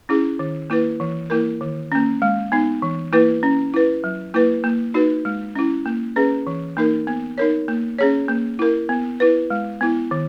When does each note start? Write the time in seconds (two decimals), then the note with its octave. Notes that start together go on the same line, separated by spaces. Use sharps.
0.09 C#4 E4 G#4
0.39 D#3
0.70 A#3 E4 B4
1.00 E3
1.30 A#3 E4 A#4
1.61 D#3
1.92 A#3 C#4
2.22 G#3
2.52 B3 D#4
2.82 E3
3.13 A#3 E4 B4
3.43 C#4
3.74 E4 B4
4.04 F#3
4.34 A#3 E4 B4
4.64 A#3
4.94 D#4 F#4 B4
5.25 G#3
5.55 C#4 E4
5.86 A#3
6.16 C#4 G#4 B4
6.47 E3
6.77 A#3 D#4 A#4
7.07 B3
7.38 D#4 A#4 C#5
7.68 A#3
7.99 C#4 G#4 C#5
8.28 A#3
8.59 E4 A#4
8.89 B3
9.20 E4 B4
9.50 G#3
9.81 B3 E4
10.11 D#3